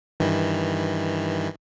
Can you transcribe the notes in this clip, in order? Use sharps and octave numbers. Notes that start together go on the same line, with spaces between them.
G2 D#3 E3